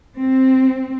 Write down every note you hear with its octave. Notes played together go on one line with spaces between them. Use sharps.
C4